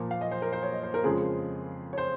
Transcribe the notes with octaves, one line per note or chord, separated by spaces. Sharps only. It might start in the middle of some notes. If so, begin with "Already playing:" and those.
Already playing: A#2 F3 A#3
F5
D#5
C5
A#4
C5
C#5
D#5
C5
A#4
F2 C#3 F3 G#3 G#4
C#5
C5